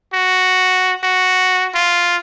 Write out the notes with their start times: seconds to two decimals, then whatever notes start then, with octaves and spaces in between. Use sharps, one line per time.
0.14 F#4
1.04 F#4
1.75 F4